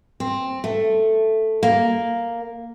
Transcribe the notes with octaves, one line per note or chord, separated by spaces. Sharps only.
C4
A3
A#3